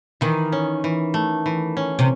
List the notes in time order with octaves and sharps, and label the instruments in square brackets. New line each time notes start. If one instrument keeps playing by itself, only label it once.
[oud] D#3 [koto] E3
[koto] C#4
E3
A3
E3
C#4
[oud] C3